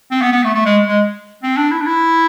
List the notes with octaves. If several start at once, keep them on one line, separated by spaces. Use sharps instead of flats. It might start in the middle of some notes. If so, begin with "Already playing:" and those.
C4
B3
B3
A3
A3
G#3
G#3
C4
D4
E4
D4
E4